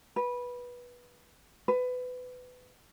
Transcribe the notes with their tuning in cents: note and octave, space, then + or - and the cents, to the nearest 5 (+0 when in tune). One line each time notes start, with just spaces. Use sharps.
B4 -15
B4 +20